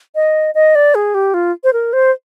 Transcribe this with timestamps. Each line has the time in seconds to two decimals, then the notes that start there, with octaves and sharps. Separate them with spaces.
0.15 D#5
0.55 D#5
0.75 D5
0.95 G#4
1.14 G4
1.34 F4
1.64 C5
1.73 A#4
1.93 C5